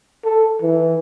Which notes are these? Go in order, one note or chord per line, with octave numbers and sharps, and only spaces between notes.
A4
E3